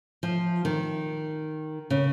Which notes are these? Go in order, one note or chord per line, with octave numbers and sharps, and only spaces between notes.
F3
D#3
C#3